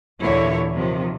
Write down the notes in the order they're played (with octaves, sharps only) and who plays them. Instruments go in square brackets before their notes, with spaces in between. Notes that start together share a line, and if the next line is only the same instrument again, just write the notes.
[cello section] D#2 A#2 D3 E3 E4 C#5
C3 D#3 F3